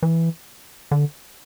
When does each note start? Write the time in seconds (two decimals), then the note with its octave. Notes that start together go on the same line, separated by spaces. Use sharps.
0.03 E3
0.91 D3